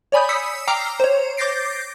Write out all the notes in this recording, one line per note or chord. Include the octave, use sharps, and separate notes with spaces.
C#5 D5 G#5 B5 D#6 G6
D#6 E6 B6 C#7
G5 A#5 D6 E6 F6 C7
C5 C#5
D6 G6 A6 A#6 C7 D7